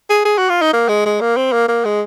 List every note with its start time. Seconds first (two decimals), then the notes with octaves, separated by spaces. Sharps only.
0.10 G#4
0.25 G#4
0.38 F#4
0.49 F4
0.61 D#4
0.73 A#3
0.89 G#3
1.06 G#3
1.21 A#3
1.37 C4
1.52 A#3
1.69 A#3
1.85 G#3